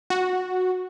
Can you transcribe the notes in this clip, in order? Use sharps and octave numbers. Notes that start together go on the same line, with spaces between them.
F#4